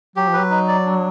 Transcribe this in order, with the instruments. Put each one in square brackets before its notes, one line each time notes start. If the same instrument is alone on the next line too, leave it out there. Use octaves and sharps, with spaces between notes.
[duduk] F#3 [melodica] G4
[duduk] F3
[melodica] B4
[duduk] F#3
[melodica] D#4
D5
D4